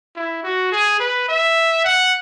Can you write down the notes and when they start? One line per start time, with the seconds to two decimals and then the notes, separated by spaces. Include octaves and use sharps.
0.16 E4
0.44 F#4
0.72 G#4
1.00 B4
1.29 E5
1.85 F#5